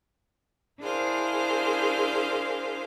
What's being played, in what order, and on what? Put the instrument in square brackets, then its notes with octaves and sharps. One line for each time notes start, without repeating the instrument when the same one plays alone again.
[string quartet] D4 E4 G#4 A#4 C5 F5